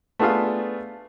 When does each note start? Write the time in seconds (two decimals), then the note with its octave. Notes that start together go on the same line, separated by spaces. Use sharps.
0.19 A3 B3 D4 F4 G#4 F5